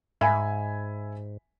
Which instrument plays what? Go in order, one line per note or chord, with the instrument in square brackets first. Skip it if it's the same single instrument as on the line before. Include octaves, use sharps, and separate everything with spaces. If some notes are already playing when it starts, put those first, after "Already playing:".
[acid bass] G#2 [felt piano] E5 G#5 B5